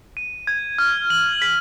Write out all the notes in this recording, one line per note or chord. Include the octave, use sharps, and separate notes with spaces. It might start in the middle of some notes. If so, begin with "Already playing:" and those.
D#7
G#6
F6
F#7
B6